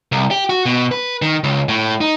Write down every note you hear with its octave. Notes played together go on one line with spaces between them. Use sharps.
C2
G4
F#4
B2
B4
D#3
C#2
A2
D#4